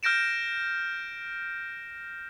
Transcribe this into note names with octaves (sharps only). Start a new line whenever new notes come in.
F6 G6 A#6 D7 E7